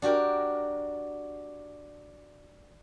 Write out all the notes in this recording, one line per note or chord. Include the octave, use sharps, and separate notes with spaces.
D4 F#4 G4 A#4